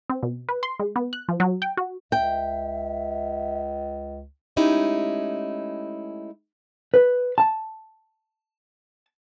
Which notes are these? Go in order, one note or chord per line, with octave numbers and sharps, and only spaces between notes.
C4
B2
B4
C6
G#3
B3
F#6
F3
F#3
G5
F#4
C#2 E5 G5
G#3 A3 C#4 D#4 E4 G4
B4
A5